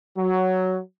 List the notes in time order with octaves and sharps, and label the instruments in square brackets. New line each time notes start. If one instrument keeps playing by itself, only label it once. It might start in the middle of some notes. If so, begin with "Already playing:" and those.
[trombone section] F#3